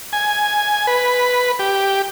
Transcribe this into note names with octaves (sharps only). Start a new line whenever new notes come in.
G#5
B4
G4